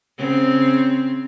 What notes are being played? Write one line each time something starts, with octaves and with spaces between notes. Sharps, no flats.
C#3 C4